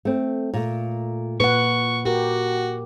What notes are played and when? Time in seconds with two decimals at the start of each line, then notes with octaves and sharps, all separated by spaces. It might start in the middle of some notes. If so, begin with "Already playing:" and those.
0.05 A3 C4
0.54 A#2 A3
1.40 A#2 B4 F#5 C#6
2.05 F#4 G4 A#4